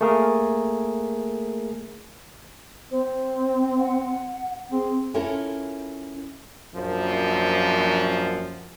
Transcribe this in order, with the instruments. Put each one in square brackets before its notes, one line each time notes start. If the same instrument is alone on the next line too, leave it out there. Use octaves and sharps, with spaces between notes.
[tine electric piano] A3 A#3 G#4 A#4
[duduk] C4 [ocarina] C5
[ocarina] F#5
[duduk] C4 [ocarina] G#4
[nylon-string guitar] C#4 E4 F4 A4 A#4 E5
[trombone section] A#1 F#2 F3